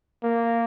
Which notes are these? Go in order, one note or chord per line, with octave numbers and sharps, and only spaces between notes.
A#3